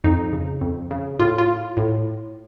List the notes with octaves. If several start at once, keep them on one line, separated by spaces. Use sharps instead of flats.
F2 D#4
C#3
F2
C#3
A2 F4
F4
A2